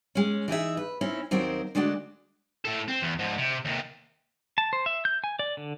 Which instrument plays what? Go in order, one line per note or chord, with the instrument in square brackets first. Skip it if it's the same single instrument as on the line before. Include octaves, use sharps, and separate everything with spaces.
[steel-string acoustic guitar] G#3 C#4
E3 D#4 G#4 E5
B4
C4 C#4 D#4 E4
D#2 F#3 C4 D#4 A#4 C5
D3 G#3 A3 D4 F#4
[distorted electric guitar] A2 A4
C4
E2
G#2 F3
C3
D#2 C3
[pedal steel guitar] A5
C5
E5
G6
G#5
D5
D3